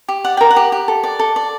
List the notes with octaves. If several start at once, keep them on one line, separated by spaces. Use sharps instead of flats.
G4
D5 F#5
A#4 G5
F#5
G4
G4
A4
D5
A4
D5